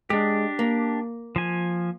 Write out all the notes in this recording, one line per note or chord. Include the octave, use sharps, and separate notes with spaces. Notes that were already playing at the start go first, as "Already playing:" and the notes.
G#3 D4 G4
A#3
F3 G#5